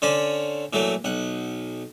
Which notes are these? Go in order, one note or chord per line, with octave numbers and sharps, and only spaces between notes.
D3 C#4 C5 D5
A#2 E3 F#3 A3
B1 F#5